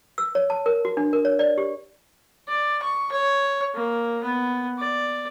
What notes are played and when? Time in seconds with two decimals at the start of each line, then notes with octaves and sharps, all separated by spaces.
0.18 E6
0.35 C#5
0.50 A5
0.66 A#4
0.85 F#4
0.97 D4
1.13 A#4
1.25 C#5
1.39 D5
1.58 G4
2.48 D5
2.82 C#6
3.12 C#5
3.74 A#3
4.23 B3
4.78 D5